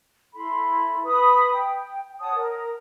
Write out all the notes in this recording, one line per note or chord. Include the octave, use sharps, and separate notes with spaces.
E4 A4 B5 C6
B4 B5 D#6
G5
C#5 F#5 A5 D#6
A#4